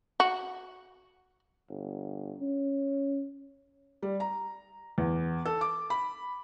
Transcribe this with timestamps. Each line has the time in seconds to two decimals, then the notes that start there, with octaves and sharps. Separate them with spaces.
0.20 F#4
1.69 G1
2.38 C#4
4.02 G3
4.20 A#5
4.98 E2
5.45 A4
5.61 D6
5.90 B5